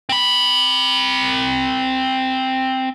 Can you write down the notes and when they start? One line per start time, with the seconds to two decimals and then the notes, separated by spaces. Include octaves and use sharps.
0.09 C4 B5